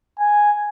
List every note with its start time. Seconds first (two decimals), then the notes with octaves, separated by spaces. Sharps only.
0.19 G#5